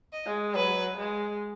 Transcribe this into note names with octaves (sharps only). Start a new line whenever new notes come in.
D#5
G#3
F#3 B4
G#3